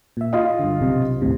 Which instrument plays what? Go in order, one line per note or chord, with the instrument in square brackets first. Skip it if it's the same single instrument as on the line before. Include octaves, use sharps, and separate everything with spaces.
[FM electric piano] A#2 E5
[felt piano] F4 D#5 [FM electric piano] F5
[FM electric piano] G2 D3
B1 C3
D#2 A2 C3